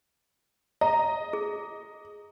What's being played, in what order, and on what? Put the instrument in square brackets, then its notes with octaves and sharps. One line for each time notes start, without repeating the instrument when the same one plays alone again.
[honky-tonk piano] D#5 [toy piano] A#5
[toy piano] G#4